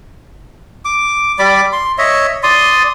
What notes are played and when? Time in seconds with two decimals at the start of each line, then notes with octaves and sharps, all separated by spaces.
0.85 D6
1.39 G3 D5 B5 D6
1.73 C6
1.98 C#5 D#5 E5
2.43 D5 C6 D#6